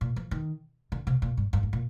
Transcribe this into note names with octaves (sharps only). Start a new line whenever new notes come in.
A#2
F3
D#3
D3
C3
A#2
G2
G2
G#2
A#2